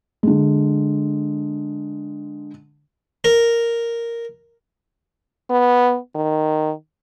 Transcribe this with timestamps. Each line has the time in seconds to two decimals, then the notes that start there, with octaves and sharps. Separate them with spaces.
0.23 D3 G#3
3.24 A#4
5.50 B3
6.15 D#3